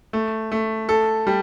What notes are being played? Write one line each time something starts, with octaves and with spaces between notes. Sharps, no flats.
A3
A3
A4
G3